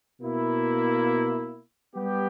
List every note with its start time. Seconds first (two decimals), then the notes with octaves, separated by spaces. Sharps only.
0.20 B2 A#3 E4
1.94 G3 B3 G4